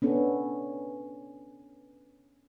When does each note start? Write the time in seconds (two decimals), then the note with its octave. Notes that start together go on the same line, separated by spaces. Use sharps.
0.02 B3 C#4 D4 A4